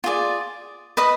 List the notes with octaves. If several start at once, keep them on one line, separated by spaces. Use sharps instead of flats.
F4 G#4 D5
B4 D#5 B5 D#6